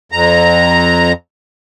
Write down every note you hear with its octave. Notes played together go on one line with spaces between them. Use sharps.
F2 A#5